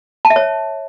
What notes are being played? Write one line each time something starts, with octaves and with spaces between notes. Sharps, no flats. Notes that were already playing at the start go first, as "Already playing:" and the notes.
A5
E5
C#5